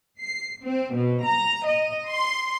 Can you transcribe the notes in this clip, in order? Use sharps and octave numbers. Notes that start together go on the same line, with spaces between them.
C7
C4
B2
A#5
D#5
C6